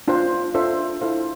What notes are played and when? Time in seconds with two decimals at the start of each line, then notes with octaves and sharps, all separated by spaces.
0.08 D4 F4 C5
0.54 D4 F4 A4 C5 E5
1.01 E4 A4 C5 F5